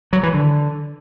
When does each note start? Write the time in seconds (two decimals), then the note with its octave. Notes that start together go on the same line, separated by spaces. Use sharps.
0.13 F#3
0.23 E3
0.34 D3